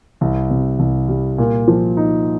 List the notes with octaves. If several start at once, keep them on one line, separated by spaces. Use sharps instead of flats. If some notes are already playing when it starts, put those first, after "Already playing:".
C2
C3
C2
G3
A#2
F3
D#4